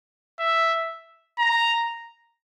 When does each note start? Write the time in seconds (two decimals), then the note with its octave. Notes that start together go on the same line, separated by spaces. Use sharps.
0.39 E5
1.39 A#5